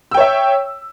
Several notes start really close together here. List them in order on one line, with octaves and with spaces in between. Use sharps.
E6 G5 C#5 E5